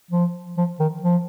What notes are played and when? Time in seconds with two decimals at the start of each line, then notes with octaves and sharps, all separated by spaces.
0.11 F3
0.57 F3
0.80 D#3
1.03 F3